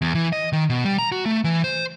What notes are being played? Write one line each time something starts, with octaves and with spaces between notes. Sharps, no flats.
E2
E3
D#5
D#3
B2
G3
A#5
F#4
A3
E3
C5